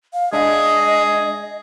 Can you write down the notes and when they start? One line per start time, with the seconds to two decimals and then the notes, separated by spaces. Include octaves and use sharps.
0.14 F5
0.33 G#3 D4 G#4 D#5 E5